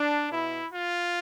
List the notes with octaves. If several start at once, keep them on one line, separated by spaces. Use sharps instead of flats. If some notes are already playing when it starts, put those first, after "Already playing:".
Already playing: D4
B2 E4
F4